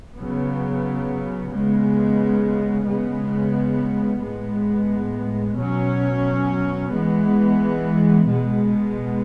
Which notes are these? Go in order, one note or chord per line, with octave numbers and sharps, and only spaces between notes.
C#3 F#3 B3
C#3 G#3 B3
C#3 G#3 B3
A2 G#3 B3
B2 F#3 C#4
E3 G#3 B3
B2 G#3 B3